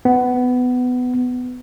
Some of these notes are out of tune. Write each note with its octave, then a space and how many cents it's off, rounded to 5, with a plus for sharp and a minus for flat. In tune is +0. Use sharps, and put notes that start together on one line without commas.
B3 +15